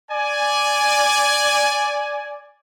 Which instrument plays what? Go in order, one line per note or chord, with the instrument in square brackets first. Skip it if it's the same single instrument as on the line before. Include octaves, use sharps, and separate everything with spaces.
[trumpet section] D5 G#5